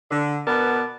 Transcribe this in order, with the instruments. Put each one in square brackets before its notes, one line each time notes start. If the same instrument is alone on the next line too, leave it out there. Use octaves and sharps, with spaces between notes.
[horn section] D3
B2 B3 A#4 D5 A5